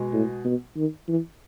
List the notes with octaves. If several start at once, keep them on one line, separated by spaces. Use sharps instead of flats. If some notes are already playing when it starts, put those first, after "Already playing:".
Already playing: B2 G#3
A2
B2
D#3
E3